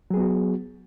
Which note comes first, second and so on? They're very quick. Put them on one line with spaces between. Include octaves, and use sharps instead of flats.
F#3 G#4 B3 F#4